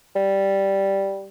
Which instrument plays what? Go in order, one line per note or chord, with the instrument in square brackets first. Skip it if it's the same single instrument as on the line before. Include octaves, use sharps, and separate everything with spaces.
[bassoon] G3